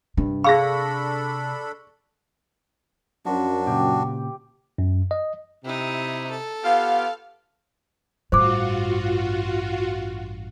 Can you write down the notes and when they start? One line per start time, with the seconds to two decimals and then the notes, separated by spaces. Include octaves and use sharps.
0.17 G2 C3
0.44 D4 G#4 A4 F5 B5 C#6 A#6
3.26 F#2 F3 D4 F#4
3.67 A#2 C#3 G4
4.78 F#2
5.11 D#5
5.64 C3 D#4 E4
6.31 A4
6.64 B3 F4 G4 F5
8.32 A1 G2 F4 F#4 C5 D6